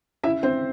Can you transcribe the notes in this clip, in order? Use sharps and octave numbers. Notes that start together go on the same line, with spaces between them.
C#3 E4 E5
C4 C5